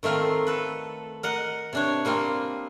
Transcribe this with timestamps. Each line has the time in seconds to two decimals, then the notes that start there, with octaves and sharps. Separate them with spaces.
0.03 D#3 A3 C4 F4 A#4
0.47 A4 B4
1.23 A#4 D#5 F#5
1.73 C3 D4 C#5
2.05 G3 A#3 C4 F4